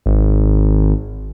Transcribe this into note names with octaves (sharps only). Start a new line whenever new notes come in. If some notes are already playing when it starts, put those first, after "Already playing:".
G#1